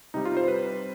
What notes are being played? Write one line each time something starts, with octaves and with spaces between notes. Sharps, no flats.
C3 G3 D#4
F4
C5
B4